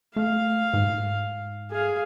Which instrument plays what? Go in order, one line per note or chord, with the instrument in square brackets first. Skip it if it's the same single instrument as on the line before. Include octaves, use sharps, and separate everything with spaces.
[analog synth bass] A3 [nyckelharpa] F5
[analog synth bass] G#2
[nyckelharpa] G#4 F5